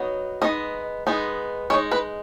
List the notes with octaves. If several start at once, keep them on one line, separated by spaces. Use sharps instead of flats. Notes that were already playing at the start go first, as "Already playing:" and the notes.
Already playing: F#3 B3 D#4
G#3 B3 D#4 D#5
G#3 B3 D#4
G#3 D#4 C#5
B4